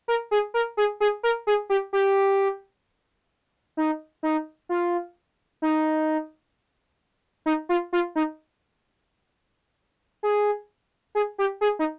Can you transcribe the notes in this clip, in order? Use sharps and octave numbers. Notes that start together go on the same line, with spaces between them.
A#4
G#4
A#4
G#4
G#4
A#4
G#4
G4
G4
D#4
D#4
F4
D#4
D#4
F4
F4
D#4
G#4
G#4
G4
G#4
D#4